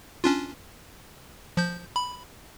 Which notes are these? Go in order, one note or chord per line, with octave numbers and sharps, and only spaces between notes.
C#4 D4 F4
F3 G6
B5